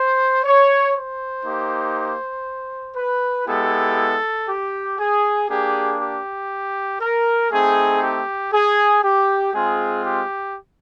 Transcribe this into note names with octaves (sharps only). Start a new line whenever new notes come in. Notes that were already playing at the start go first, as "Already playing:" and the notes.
Already playing: C5
C#5
C5
A#3 D#4 G4
B4
G#3 B3 E4 G4 A4
G4
G#4
A#3 D4 G4 G#4
G4
A#4
A3 C4 D#4 G#4
G4
G#4
G4
G#3 C4 F4 G#4
G4